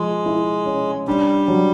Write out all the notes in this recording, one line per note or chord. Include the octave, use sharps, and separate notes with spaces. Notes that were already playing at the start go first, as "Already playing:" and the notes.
Already playing: F3 G#3
E4
C#4
G3 D4
F#3